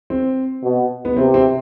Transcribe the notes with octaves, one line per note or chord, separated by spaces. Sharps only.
C4
B2
B3
C3 C4
C4